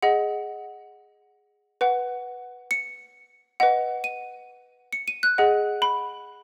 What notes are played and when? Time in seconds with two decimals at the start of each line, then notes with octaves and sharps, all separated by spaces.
0.02 G#4 D#5 F#5
1.81 B4 F#5
2.71 C#7
3.60 B4 D#5 F#5
4.04 D#7
4.93 C#7
5.08 D#7
5.23 F#6
5.38 G#4 D#5 F#5
5.82 B5